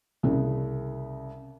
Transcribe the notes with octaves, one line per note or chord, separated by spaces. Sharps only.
C2 C#3